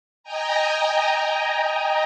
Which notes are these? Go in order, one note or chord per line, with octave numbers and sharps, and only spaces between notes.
D#5 G5 G#5 A#5